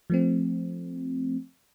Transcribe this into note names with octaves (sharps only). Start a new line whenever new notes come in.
F3 A3 C4